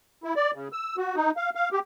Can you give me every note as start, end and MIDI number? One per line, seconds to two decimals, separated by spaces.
0.24 0.34 64
0.36 0.51 74
0.54 0.68 49
0.73 0.96 88
0.97 1.16 66
1.16 1.31 63
1.37 1.50 77
1.55 1.69 77
1.72 1.79 67